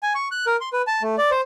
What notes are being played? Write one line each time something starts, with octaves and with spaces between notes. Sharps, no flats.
G#5
C#6
F#6
A#4
C6
B4
A5
A3
D5
C5